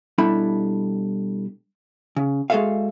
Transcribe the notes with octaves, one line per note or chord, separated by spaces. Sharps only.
B2 G3 D4 E4 A4 B5
C#3
G#3 F#4 G#4 A4 E5 F5